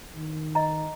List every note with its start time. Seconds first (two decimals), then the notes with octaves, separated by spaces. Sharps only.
0.16 D#3
0.55 D#5 A#5